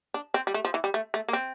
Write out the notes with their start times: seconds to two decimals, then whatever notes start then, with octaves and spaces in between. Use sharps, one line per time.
0.14 D4
0.34 C4
0.47 G3
0.54 A3
0.65 F3
0.74 E3
0.84 G3
0.94 A3
1.14 A3
1.28 A#3
1.33 C4